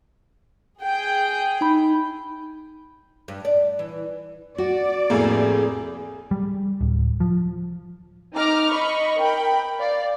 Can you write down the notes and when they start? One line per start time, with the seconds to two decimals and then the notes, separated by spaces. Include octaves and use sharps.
0.80 G#4 G5
1.61 D#4 B5
3.28 G2
3.45 D5
3.79 E3
4.58 F#4 D5
5.10 F1 A2 A#3 G#4
6.31 G3
6.81 D1
7.20 F3
8.35 D#4 A#5 D6 F6
8.70 D#5 B5 C#6
9.19 A#4 G5 B5
9.79 D5 F5